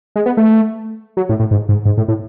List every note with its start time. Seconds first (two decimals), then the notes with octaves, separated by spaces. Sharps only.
0.16 G#3
0.26 B3
0.37 A3
1.17 F#3
1.29 A2
1.40 A2
1.51 G#2
1.69 G#2
1.85 G#2
1.97 A2
2.08 A2